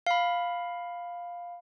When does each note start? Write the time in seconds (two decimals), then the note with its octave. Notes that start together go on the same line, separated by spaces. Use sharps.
0.07 F5 B5